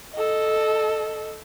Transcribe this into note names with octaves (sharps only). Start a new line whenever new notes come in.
A4 D#5